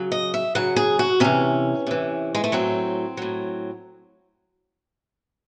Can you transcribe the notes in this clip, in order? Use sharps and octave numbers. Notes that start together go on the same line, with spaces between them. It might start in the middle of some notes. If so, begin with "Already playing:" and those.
Already playing: C#3 F#3
D#5
E5
C#3 F#3 F#5
G#4
F#4
C3 E3 C#4
C3 E3
G#3
A3
A2 F#3 C4
A2 F#3